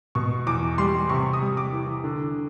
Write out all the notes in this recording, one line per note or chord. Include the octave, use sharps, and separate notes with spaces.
B2 C#6
E2 D6
G3 C6
C3 C#6
D#6
G3
D6
E3
D3